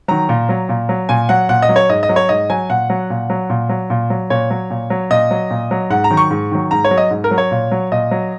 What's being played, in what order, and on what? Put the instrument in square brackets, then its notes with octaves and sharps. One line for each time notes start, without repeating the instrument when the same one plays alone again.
[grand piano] D#3 F#3 A#5
A#2
F#3
A#2
F#3
A#2 G#5
F#3 F#5
A#2 F#5
D#5
F#3
C#5
G#2 D#5
D#5
F#3
C#5
G#2 D#5
F#3 G#5
A#2 F#5
F#3
A#2
F#3
A#2
F#3
A#2
F#3
A#2 C#5
F#3
A#2
F#3
A#2 D#5
F#3
A#2
F#3
G#2 F#5
A#5
D#3 F#3
C#6
G#2
D#3 F#3
G#2 A#5
C#5
F#3
D#5
G#2
A#4
F#3
C#5
A#2
F#3
A#2 D#5
F#3